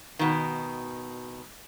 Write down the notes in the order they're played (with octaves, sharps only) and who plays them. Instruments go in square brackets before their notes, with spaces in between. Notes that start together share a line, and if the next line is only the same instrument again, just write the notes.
[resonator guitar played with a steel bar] B2 D#3